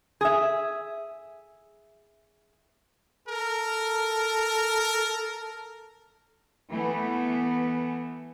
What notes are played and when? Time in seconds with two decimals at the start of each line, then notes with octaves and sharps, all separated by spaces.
0.21 G#4 E5
3.28 A4 A#4
6.70 E3 A3 B3